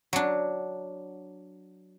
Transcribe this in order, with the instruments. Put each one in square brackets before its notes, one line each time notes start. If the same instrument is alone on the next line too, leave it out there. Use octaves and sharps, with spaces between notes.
[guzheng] F#3 D4